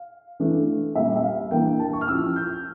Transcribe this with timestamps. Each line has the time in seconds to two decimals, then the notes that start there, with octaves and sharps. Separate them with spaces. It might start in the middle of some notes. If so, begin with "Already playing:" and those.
Already playing: F5
0.40 E3 A3 D4
0.95 A#2 G3 C#4 E5
1.16 E5
1.24 F5
1.51 E3 A#3 D4 G5
1.66 G5
1.79 A5
1.93 C#6
2.01 F6
2.08 F3 C#4 E4 E6
2.36 G6